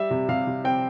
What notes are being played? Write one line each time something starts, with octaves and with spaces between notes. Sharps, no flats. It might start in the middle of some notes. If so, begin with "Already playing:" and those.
Already playing: G3 E5
C3
C3 F5
C3
C4 G5